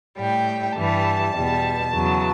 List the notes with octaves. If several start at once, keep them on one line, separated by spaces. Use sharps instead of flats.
A2 G3 G5
G2 E3 G3 A5
E2 B2 G3
E2 C#3 F#3